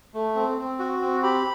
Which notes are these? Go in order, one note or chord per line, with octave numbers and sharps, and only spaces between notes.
A3
C4
C4
F#4
C4
G4 B5